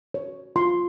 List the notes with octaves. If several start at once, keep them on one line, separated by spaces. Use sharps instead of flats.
C#5
F4 C6